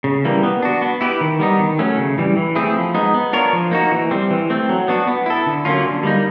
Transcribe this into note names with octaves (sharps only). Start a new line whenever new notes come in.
C#3
E3 G3 A#3
B3
D4 F#4
B3
E4 G4 B4
D#3
G3 B3 D#4
D#3
F#3 A3 C#4
C#3
E3 G3
E3
A3 C4 E4 G#4
F3
G#3 B3 D#4
B3
D4 F4 A#4 C#5
F3
A#3 D#4 F#4
E3
G3 C4
E3
A3 C4
F#3
B3 D4 F#4
B3
E4 A4
D3
F#3 A#3 C#4 F4
D3
G3 A#3 D#4